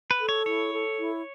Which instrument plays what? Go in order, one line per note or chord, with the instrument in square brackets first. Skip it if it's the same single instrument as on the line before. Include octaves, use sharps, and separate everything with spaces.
[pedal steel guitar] B4
[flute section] A4
[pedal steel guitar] C#5
[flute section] E4 [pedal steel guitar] C#5
[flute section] A4
E4